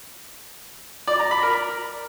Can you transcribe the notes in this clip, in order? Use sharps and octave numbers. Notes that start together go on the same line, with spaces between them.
D5
A#5
B5
A#4